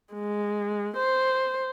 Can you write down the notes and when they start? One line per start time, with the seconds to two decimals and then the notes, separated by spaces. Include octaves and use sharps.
0.14 G#3
0.96 C5